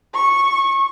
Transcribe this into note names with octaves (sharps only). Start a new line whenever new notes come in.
C#6